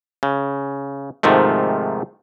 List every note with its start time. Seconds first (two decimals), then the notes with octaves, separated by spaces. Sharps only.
0.23 C#3
1.23 G#2 C3 D#3 F3 A3